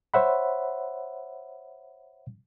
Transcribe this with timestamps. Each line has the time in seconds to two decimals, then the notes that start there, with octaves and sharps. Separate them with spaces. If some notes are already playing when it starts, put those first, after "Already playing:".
0.14 C5 C#5 E5 F#5 B5